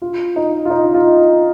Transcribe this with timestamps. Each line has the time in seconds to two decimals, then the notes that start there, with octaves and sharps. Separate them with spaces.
0.02 F4
0.36 D#4
0.65 F4
0.70 D#4
0.94 F4